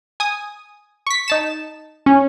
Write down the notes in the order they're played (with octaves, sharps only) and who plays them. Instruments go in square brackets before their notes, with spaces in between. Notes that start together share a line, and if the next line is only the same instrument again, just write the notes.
[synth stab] G#5 D#6
C#6 B6
D#4 A5 E7
[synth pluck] C#4